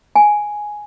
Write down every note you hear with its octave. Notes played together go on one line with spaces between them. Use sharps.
G#5